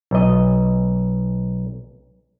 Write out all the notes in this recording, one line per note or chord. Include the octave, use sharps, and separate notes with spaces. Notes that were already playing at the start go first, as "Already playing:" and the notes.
B1 D#5